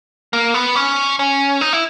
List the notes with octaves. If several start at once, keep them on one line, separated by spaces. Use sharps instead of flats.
A#3
B3
C#4
C#4
D#4
E4